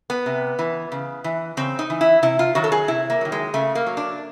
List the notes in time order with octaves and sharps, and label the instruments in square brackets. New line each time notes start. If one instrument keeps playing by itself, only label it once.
[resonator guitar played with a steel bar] B3
C3
E3
C#3
E3
C#3 C4
D#4
E3
E4
C3 E4
F4
D#3 F#3 F#4
A4
G#4
C3 E4
A#3
D#3 F#3
G#3
C#3 A3
A#3
F#3
D4